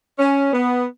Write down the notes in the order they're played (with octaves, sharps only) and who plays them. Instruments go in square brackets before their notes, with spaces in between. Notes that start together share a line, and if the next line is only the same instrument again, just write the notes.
[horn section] C#4
B3